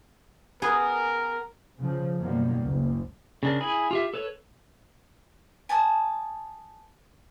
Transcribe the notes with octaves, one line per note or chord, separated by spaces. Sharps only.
B3 G#4 A#4
C#3 F3
F#2 B2 D#3 G3 A#3 B3
F#1 C#2
C#3 D4 A#4
E4 G#4 G#5 B5
F4 G4 E5
A4 B4 C#5
G#5 A5 D6 D#6